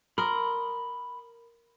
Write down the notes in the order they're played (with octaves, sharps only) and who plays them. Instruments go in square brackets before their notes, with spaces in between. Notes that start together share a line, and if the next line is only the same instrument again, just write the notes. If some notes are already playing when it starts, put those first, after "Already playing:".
[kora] A#4 [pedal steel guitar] B5 C6 D#6